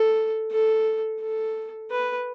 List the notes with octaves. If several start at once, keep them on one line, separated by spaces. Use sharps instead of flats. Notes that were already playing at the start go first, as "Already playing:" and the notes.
Already playing: A4
A4
A4
B4